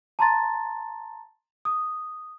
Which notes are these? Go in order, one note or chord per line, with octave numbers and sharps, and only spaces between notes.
A5 A#5 C6 A6
D#6